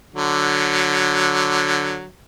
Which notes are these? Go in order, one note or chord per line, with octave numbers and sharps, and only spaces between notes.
D3 F#3